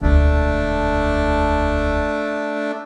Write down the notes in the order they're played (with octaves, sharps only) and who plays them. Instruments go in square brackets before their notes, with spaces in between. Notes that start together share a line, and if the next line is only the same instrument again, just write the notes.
[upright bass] E1 D2 [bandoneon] A3 D4